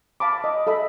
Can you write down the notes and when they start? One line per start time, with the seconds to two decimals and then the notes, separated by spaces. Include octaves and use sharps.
0.20 F5 A5 B5 D6
0.44 D#5
0.67 A4 D#5 E5 B5